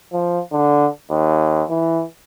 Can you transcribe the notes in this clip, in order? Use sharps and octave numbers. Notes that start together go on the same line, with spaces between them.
F3
D3
D#2
E3